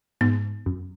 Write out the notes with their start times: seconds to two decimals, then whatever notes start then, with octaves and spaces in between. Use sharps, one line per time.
0.21 G#2 B3
0.66 F#2